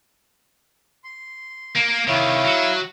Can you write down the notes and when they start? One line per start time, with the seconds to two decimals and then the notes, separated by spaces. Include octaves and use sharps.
1.04 C6
1.75 A#3
2.08 C2 D#3 E4 C#5 F5
2.44 F#3